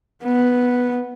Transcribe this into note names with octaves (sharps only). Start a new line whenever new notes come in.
B3